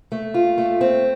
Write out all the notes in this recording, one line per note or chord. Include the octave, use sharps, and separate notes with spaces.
A3
F4
A3
C4